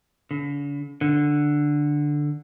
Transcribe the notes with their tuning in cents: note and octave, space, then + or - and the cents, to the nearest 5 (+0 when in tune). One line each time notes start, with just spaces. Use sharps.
D3 -45
D3 +5